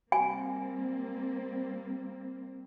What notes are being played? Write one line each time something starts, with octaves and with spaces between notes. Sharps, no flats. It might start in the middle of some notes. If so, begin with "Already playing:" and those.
G3 A#3 C4 G#5